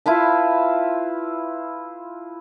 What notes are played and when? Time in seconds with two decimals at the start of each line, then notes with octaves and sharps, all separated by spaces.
0.06 E4 F4 B4 A5